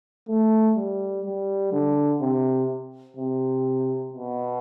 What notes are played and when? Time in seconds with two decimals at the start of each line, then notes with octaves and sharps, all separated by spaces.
0.29 A3
0.77 G3
1.25 G3
1.72 D3
2.21 C3
3.16 C3
4.13 B2